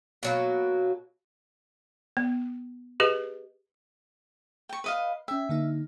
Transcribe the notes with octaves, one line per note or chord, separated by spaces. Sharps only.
B2 F#3 A#3
B3
G4 G#4 B4 D#5
G5 C#6
B4 D#5 F5
C#4 E5 G5
D3 A#3 D#4